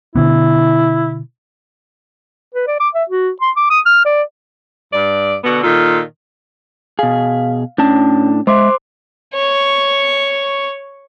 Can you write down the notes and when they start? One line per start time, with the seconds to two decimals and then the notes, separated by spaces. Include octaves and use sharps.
0.16 B2 D3 B3 E4
2.55 B4
2.67 D5
2.80 D6
2.94 E5
3.10 F#4
3.42 C6
3.56 D6
3.70 D#6
3.86 F6
4.05 D5
4.93 G2 D5
5.44 B2 D3 B3 F#4
5.63 A#2 D#3 F4 A4
6.99 B2 G#4 F5
7.78 A2 C#4 D4 A5
8.47 G#3 C5 E5 C6 D6
9.34 C#5 C#6